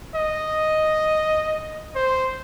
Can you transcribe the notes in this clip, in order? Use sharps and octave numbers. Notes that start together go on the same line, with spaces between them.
D#5
C5